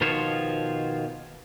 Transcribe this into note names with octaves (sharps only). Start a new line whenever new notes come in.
B2 D#3 F3 F4 C5 C#5